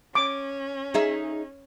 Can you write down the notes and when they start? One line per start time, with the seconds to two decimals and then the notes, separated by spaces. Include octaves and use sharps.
0.15 C#4 D6
0.94 D#4 G#4 E5